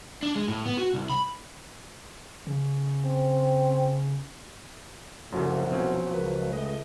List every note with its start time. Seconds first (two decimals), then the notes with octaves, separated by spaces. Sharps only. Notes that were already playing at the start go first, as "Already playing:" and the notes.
0.23 D4
0.36 G#3
0.48 A2
0.66 B3
0.78 F#4
0.94 C2
1.10 B5
2.47 C#3 C#4
3.05 C4
5.32 C2 F#2 C#3 F3 F#3 A3 F#4
5.71 B2 C4 C#4
6.14 C#2 A#4 B4
6.53 A3 D#5